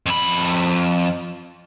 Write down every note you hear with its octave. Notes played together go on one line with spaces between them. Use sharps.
F2 B5